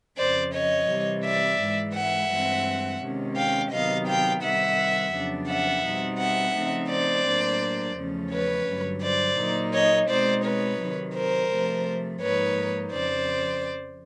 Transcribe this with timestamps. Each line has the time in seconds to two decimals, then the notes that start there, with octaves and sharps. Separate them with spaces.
0.18 F2 C#3 F3 C5 D5
0.53 C#5 D#5
0.88 C3 E3 G3
1.24 D5 E5
1.59 G#2 E3 G#3
1.95 E5 F#5
2.30 G2 E3 G#3 C4
3.02 C3 D#3 G#3 C#4
3.36 F5 G5
3.71 C3 D#3 F#3 B3 D#4 D#5 F5
4.07 F5 G5
4.42 C3 D#3 G3 E5 F#5
5.13 F2 C#3 F#3 B3 D4
5.48 E5 F#5
5.84 B2 G3 C4 D#4
6.20 E5 F#5
6.55 C#3 F3 A3 C4 D#4
6.90 C5 D5
7.25 A2 F#3 A#3 D4
7.96 E2 C#3 F3 A3 C#4
8.32 B4 C#5
8.67 G2 D3 F#3
9.03 C5 D5
9.38 A#2 F#3 A#3 D#4
9.73 C#5 D#5
10.09 B2 G#3 C4 D#4 C5 D5
10.44 B4 C#5
10.79 C3 D#3 F#3
11.14 A#4 C5
11.51 C3 F3 A3
12.20 G#2 F3 A#3 D#4 B4 C#5
12.92 F2 C#3 F3 C5 D5